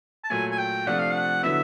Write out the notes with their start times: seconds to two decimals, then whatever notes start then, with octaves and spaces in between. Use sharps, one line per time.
0.24 A5
0.30 A#2 F#3 A3 G#5
0.51 G#5
0.58 G5
0.87 C3 F3 A3 D4 F4 F#5
0.99 F5
1.11 F#5
1.43 D3 F#3 B3 E4 E5